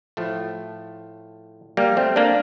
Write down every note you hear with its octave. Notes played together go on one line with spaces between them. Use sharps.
A2 F3 A3
G3 A#3
A3 C4
A#3 D4